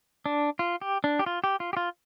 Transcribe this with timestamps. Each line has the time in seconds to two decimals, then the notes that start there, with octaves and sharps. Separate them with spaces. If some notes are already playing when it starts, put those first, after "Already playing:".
0.26 D4
0.59 F4
0.81 G4
1.04 D4
1.19 G4
1.26 F4
1.44 G4
1.60 F4
1.73 G4
1.77 F4